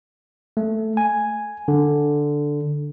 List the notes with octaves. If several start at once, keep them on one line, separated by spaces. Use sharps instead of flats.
A3
G#5
D3